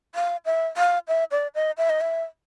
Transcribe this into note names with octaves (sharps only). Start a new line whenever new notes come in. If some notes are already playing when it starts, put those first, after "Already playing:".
F5
E5
F5
E5
D5
D#5
E5
D#5
E5